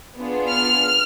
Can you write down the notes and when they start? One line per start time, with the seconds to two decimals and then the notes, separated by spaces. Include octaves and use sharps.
0.18 B3 D4 F4 G#4
0.51 F6